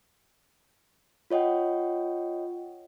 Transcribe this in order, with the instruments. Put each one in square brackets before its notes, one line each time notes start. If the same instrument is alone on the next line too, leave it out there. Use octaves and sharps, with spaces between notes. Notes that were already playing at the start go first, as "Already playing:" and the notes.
[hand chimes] F4 C#5 D#5 F#5 G5